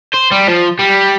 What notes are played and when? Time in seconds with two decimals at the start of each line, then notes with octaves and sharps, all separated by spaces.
0.14 C5
0.32 G3
0.48 F3
0.79 G3